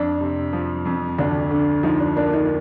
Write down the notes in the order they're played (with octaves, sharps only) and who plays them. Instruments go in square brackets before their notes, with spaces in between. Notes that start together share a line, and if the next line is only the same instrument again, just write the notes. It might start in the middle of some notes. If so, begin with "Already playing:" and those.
Already playing: [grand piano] F2 [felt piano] D4
[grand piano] C3
F3
F2
[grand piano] D2 [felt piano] D4
[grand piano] D3
[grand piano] F3 [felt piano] D#4
[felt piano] D4
[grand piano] A#3 [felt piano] D4
[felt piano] D#4